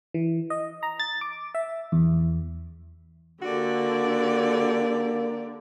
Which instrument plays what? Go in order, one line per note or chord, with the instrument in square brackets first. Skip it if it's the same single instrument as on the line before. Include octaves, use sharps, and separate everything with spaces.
[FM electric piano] E3
D#5
A#5
A6
D6
E5
E2
[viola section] D3 [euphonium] A#3 [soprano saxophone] F#4 [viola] G4 D5